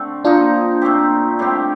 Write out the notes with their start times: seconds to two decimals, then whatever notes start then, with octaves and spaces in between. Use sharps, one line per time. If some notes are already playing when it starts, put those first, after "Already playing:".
Already playing: D3 A3 C4
0.24 F3 A#3 D4 D#4 F4
0.82 A#2 A3 C4 G4
1.39 A2 G3 C4 G4